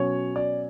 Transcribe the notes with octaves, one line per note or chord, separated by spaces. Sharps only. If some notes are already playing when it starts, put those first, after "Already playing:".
Already playing: B2 F#3 C#4 C#5
D5